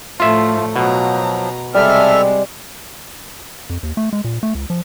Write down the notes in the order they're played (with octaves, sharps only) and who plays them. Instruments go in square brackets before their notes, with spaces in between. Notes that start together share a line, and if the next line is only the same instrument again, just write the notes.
[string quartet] A2 F3 A3 [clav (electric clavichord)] F4 E5
[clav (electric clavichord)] B2 [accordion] F3 F#3 [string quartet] A#5
[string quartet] C3 G#3 [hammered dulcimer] G3 [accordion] A4 E5 F6
[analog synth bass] F2
D#2
A3
G#3
A#2
A3
C#2
F3